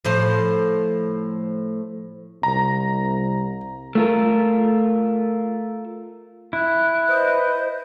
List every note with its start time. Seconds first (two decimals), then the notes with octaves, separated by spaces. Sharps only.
0.05 A2 F3 C5
2.43 C2 A#5
3.95 A3 F4 A#4
6.53 E4 F#6
7.08 B4 C5 D#5